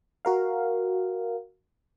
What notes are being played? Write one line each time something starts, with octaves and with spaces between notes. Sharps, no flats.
F#4 A#4 F5